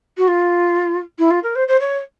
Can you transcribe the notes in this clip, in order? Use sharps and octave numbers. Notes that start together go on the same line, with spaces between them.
F#4
F4
E4
F4
A#4
C5
C5
C#5